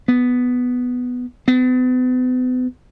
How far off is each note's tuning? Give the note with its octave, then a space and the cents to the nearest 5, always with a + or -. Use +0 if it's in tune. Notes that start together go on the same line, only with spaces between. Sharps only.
B3 +5
B3 +40